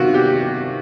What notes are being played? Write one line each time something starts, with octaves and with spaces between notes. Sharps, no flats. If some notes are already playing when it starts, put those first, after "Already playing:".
Already playing: C3 D#3 F4 F#4
G4